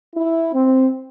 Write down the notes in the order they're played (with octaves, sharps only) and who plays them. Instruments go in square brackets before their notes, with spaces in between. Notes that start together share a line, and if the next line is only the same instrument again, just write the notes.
[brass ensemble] E4
C4